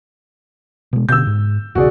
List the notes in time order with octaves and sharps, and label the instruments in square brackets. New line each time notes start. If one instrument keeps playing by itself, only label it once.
[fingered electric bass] B2 G#3
[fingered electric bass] B2 D3 [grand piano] E6 G6
[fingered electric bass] G#2
[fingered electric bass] E1 B1 C#3 [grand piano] F#4 G#4 D5